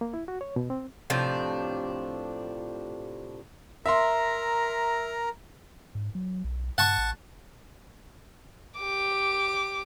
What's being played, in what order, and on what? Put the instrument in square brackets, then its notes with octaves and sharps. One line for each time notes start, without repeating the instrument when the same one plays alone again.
[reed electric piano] A#3
E4
F#4
C#5
B2
C4
[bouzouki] A2 C3 F3 D4
[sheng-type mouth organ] A#4 A#5 [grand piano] E5 C6
[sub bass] G#2
F#3
B1
[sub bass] G2 [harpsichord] F#5 A5 C#6
[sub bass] A1
[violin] G4 D6